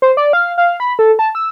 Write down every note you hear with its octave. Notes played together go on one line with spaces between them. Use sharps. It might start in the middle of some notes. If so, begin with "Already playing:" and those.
C5
D5
F5
F5
B5
A4
A5
E6